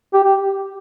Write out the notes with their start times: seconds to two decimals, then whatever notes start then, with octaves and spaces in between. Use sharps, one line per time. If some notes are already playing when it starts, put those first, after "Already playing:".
0.13 G4
0.24 G4